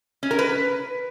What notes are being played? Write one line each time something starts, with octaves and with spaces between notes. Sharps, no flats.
C#4
A#4
B4